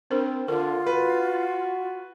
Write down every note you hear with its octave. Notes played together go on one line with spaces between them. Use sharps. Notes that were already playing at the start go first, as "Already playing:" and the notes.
C4 D4 A#4 C5
D3 F4 A#4
F#4 B4